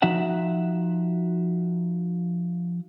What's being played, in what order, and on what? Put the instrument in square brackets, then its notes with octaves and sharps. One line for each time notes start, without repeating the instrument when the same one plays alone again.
[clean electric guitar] F3 D#4 F#4 E5 F#5